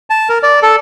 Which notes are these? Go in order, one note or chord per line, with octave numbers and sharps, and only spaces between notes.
A5
A#4
D5
A4